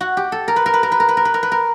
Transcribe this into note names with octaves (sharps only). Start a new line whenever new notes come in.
F#4
G4
A4
A#4
B4
A#4
B4
A#4
B4
A#4
B4
A#4
B4
A#4
B4
A#4